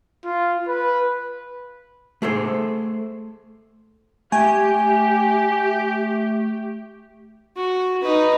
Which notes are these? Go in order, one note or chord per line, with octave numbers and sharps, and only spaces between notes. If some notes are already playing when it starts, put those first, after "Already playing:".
F4
B4
A3 G#4 A4 C5
A3 G4 G#5
F#4
D#4 B4